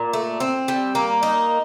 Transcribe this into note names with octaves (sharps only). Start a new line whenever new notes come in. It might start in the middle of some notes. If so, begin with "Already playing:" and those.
Already playing: A#2
A3
C4
G3
A#3
D#4